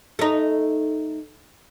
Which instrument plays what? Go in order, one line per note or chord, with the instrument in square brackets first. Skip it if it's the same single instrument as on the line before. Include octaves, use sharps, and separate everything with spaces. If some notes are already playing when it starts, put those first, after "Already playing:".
[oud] A3 D#4